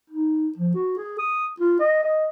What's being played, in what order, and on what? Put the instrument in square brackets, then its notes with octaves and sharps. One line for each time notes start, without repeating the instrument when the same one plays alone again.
[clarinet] D#4
F3
F#4
G#4
D#6
F4
D#5
D#5